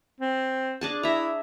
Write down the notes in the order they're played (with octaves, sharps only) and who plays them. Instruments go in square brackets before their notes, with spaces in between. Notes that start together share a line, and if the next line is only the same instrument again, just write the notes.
[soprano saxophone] C4
[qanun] D4 G#4 A5
[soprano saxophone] E4 [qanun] E5 A#5